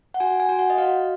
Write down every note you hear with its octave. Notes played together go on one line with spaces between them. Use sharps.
F#5
F#4 G#5
G#5
F#4
F#5
D#5
F#4 F5